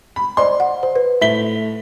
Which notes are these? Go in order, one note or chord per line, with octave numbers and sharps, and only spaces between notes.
B5
C5 D5 D#5 C6
F#5
C5
B4
A2 E5 B6 G7